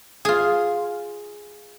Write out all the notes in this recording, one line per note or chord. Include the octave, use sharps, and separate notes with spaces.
F4 G#4